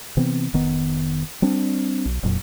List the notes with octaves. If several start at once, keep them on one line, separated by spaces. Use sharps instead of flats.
C3 E3 B3 C4
F1 D#3 B3
G3 C4 D4
B1
E1 F2 A#2 F#3